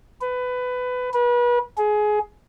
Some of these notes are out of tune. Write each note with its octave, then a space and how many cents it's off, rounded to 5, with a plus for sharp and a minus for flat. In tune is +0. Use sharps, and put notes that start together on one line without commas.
B4 +20
B4 -35
G#4 +20